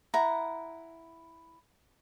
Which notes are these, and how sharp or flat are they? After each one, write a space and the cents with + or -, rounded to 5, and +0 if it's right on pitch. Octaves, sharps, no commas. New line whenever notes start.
E4 +0 F#5 +0 A#5 +0